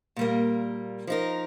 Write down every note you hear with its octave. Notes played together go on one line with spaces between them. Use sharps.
A#2 G3 A#3
F3 D#4 A#4